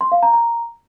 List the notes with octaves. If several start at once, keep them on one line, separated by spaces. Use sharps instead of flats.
C6
F5
A#5
A#5